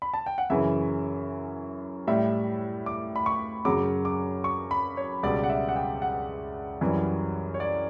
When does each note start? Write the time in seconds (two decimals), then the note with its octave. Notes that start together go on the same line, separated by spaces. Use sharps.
0.02 B5
0.14 A5
0.26 G5
0.38 F#5
0.50 F#2 C#3 E3 E5
2.07 A2 G3 E5
2.86 D6
3.16 B5
3.26 C#6
3.65 F#2 C#3 F#3 D6
4.05 D6
4.44 C#6
4.71 B5
4.97 C#5
5.23 C#2 B2 G3 D5
5.44 F#5
5.50 E5
5.69 F#5
5.76 G5
6.02 F#5
6.81 F#2 E3 G3
7.54 C#5
7.60 D5